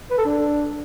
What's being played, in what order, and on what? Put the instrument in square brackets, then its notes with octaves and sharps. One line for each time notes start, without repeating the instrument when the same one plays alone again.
[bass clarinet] B4
A4
D4